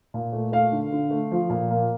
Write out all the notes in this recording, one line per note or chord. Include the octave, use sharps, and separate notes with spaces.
A#2
A3
A3 F5
D3
D3
A3
F3
A#2
A#3